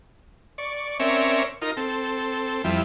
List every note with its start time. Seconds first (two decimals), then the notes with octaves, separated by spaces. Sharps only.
0.58 D5 C#6
1.00 C4 C#4 A#4 C#5 D5 E5
1.62 D#4 F4 A#4
1.77 C4 A4
2.64 F2 F3 G3 E4